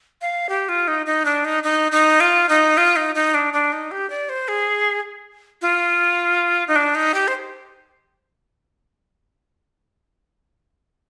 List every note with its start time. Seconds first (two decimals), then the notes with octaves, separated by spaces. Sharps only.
0.21 F5
0.49 G4
0.69 F4
0.88 D#4
1.06 D#4
1.25 D4
1.45 D#4
1.64 D#4
1.92 D#4
2.20 F4
2.49 D#4
2.77 F4
2.96 D#4
3.15 D#4
3.34 D4
3.53 D4
3.72 D#4
3.91 G4
4.10 D5
4.29 C5
4.48 G#4
5.62 F4
6.68 D#4
6.76 D4
6.95 D#4
7.14 G4
7.28 C5